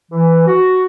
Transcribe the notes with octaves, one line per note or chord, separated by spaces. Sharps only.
E3
F#4